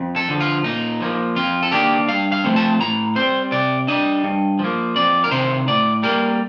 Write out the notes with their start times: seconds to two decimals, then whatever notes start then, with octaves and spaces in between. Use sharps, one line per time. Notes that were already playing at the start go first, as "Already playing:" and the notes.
Already playing: F2
0.16 A4
0.29 D3 F3
0.40 F4
0.64 A#2 D#4
1.01 F3 A#3
1.36 F2 F4
1.63 A4
1.72 D#3 A#3 D4 G4
2.08 G2 F5
2.32 F5
2.44 F3 A3 C4
2.56 A5
2.80 A2 A#5
3.15 G3 C4 C5
3.52 C3 D5
3.87 G3 D4 D#5
4.24 G2
4.59 F3 A#3
4.96 F2 D5
5.24 A#4
5.31 C3 D#3 C5
5.67 A2 D5
6.03 G3 A#3 A#4